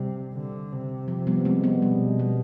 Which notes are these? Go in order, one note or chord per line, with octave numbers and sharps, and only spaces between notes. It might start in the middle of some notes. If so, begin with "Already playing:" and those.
Already playing: C3 G3
D3
C3
F3
G3 B3
G#3 C4
G3 B3
B2 G#3
G3